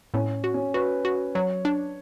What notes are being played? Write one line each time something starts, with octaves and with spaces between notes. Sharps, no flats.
A2 C#4
F#4
C#4
F#4 B4
F#4
F#3 C#5
D4